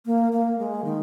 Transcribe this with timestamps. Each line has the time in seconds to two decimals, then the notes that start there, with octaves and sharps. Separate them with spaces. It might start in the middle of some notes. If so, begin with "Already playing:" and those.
0.06 A#3
0.32 A#3
0.59 G#3
0.84 D#3